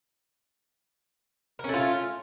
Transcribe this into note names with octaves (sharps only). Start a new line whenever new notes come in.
A3 C#4 F4 A#4